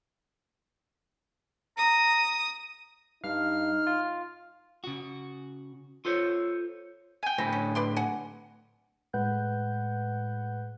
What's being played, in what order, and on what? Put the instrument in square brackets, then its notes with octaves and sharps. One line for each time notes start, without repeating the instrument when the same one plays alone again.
[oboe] A#5 [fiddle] D#6
[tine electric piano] G2 F5 [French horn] D#4 [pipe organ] F6
[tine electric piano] F4
[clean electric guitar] C#3 F#4
F4 A4 C5 C#5
[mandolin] G5 G#5
[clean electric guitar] A2 D3 B5 [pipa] C4
[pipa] C#4
B4 D5 C6
F#5 G#5
[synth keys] A2 G#3 B4 F#5 F#6 G6